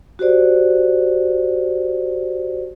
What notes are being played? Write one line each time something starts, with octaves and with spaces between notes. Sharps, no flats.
F#4 G4 C5 D5